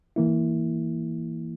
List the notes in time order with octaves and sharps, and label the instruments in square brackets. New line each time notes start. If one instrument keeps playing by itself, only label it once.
[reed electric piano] E3 A#3 E4